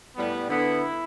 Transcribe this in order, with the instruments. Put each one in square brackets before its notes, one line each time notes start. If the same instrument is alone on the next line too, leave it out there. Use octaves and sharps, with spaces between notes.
[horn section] A2 G3 B3
D3 B3 E4